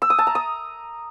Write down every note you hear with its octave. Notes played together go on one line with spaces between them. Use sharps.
E6
D#6
A5
A#5
D#6